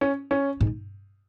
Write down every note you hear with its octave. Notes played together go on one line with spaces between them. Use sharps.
C#4
C#4
G#2